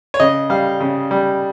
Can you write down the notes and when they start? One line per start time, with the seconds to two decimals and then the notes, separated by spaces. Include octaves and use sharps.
0.14 C#5
0.20 C#3 D#5
0.50 G3 F5
0.80 C#3
1.11 G3